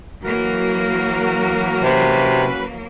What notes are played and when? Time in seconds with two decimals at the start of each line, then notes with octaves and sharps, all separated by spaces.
0.22 E3 F#3 A#3 F#4 A#4
1.83 C3 C#4 F#4 B4